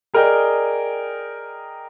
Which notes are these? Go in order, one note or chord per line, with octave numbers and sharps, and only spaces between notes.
G#4 A#4 D5 D#5 G5